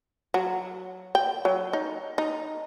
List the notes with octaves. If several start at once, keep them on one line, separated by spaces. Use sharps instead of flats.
F#3
G5
F#3
D#4
D#4